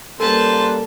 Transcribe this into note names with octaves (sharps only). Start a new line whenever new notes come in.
C#3 G3 A#3 A4 B4 C5 A5